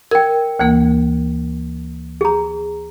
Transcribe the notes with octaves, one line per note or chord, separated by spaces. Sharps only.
A#4 G5 G#6
D2 E3 A#3
G#4 A#5